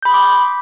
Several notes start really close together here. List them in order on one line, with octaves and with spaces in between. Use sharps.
G6 B5 D#6 C6 D6